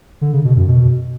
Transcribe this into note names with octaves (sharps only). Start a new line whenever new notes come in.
D3
C#3
B2
F#2
B2